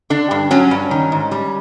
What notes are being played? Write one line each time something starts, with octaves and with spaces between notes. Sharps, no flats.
D3 D4
G2
F#3 C#4
G2
D#3
G#2
G3